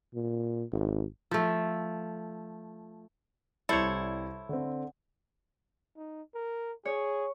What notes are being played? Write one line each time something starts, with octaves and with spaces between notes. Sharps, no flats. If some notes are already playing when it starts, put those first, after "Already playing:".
A#2
G#1
F3 A3
C2 G3 E4 A4 C5 C#5
D3 C4
D#4
A#4
G#4 C#5